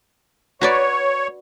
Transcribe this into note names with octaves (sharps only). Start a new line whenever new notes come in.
F#4 B4 C#5 D5